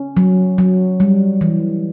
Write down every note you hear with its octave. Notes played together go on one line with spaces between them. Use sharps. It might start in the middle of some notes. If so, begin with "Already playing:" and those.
Already playing: C#4
F#3
F#3
G3
E3